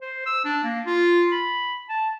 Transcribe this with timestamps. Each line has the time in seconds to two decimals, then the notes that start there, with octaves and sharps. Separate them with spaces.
0.02 C5
0.26 E6
0.45 D4
0.64 A#3
0.86 F4
1.32 B5
1.90 A5